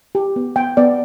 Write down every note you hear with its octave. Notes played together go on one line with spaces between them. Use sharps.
G4
B3
B3 G5
B3 D5